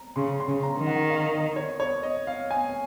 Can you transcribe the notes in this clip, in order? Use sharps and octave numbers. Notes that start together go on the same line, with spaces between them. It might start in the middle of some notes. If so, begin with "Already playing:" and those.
Already playing: A#5
C#3 C6
C6
C#3
A#5
D#3
F#5
F5
D#5
C#5
C#5
D#5
F5
G#5